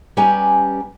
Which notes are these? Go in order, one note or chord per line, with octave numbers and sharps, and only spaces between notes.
G3 C#4 G4 B4 G#5 A#5